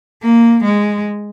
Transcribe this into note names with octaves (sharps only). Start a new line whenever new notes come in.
A#3
G#3